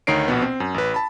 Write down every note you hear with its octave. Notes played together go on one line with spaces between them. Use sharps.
D2 D#3 D#4 C#5 C7 D7
A#1 B2 B3
C4
F#2
A1 B4
A5 B5